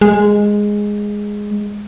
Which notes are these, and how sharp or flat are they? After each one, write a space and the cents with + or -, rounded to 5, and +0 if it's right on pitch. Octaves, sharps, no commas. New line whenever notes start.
G#3 -5